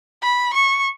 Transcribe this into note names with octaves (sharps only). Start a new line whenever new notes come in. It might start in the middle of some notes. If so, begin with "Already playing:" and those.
B5
C#6